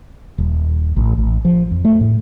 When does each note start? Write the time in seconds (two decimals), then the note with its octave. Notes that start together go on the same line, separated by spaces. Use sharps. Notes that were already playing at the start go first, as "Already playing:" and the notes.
0.38 D#1
0.96 A1
1.17 A1
1.45 F3
1.71 F2
1.85 A3
2.01 A2